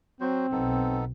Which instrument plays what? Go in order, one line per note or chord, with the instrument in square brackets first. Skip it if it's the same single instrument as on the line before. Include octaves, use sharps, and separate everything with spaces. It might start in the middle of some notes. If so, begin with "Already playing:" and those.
[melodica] F#3 F#4 C5 [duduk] C4
[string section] B1 [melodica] B3 D#4 A4